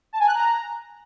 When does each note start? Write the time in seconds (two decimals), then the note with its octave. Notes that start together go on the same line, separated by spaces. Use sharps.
0.13 A5
0.20 G#5
0.27 F#6
0.34 A#5